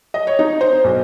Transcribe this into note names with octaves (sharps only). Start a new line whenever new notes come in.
D#5
C#5
D#4
C5
B1